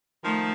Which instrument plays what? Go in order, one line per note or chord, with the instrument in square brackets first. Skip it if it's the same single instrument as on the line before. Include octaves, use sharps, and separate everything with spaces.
[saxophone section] D#3 F3 [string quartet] A3